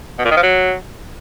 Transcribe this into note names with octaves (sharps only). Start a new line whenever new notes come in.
B2
A#2
D#3
F3
F#3